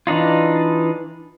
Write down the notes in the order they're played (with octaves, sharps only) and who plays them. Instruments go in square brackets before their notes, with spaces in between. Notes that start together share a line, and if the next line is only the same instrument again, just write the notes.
[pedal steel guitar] E3 D4 D#4 F4